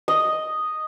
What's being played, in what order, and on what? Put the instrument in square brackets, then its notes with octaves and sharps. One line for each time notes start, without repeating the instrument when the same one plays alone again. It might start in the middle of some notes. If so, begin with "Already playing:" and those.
[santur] D#5